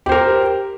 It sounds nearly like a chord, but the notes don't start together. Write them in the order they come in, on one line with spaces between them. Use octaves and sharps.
G4 C5 A#4